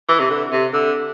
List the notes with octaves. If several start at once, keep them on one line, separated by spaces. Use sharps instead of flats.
E3
C3
D3
C3
D3